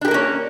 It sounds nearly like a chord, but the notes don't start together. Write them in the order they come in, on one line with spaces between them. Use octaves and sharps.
D4 G4 A#4 A#3 C#4